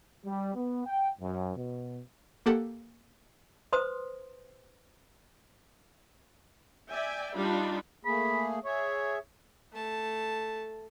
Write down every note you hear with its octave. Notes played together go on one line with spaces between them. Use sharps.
G3
B3
G5
F#2
B2
A#3 G4 A4 F#5
B4 C5 C6 D#6
D5 E5 G5 G#5
G3 D4 D#4 F4 B5
A3 A#3 G#4 B5
G#4 C#5 E5
A3 A5